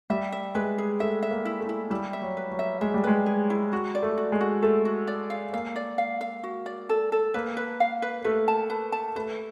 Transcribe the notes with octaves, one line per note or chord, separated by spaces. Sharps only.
G3 E5
E5
G#3 B4
G#4
A3 E5
E5
A#3
E4
A3
E4
G3 E4
E5
F#3
B4
F#3
E5
G#3 E5
G3
G#3 B4
G#4
E4
F#4
D5
A3
F#4
G#3
F#4
A3 A4
F#4
D5
F5
A#3 F5
D5
F5
F5
F#4
D5
A4
A4
A#3 B4
B4
F5
B4
A3 B4
A5
B4
A5
A3 B4